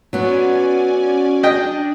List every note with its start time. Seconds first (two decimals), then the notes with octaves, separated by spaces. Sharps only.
0.13 F#3 B3 C#4 D5 G#5
1.43 D4 D#5 G5